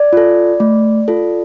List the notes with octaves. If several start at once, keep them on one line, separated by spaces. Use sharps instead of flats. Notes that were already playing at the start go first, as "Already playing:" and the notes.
Already playing: D5
F4 A4
A3
F4 A4